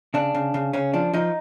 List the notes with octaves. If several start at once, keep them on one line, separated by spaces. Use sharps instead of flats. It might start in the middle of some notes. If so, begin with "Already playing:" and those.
C#3 D4
C#3
C#3
C#3 C#4
F3 D4
F3 D#4